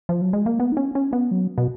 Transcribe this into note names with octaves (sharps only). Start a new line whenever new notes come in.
F3
F#3
G#3
A#3
B3
D#4
C#4
C#4
B3
F#3
B2